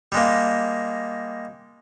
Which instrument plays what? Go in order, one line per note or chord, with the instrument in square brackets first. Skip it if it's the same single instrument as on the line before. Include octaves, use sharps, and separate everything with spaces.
[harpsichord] G3 G#3 A#3